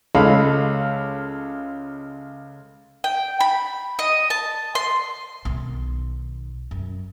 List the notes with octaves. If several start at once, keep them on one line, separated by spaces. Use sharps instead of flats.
C#2 G#3 A3 A4 F5 B5
G5
B5
D#5
A5
C6
B1 D#3
F#2